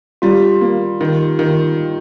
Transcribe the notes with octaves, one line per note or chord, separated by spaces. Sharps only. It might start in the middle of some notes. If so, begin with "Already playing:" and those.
G3 F4
A#3
D#3
D#3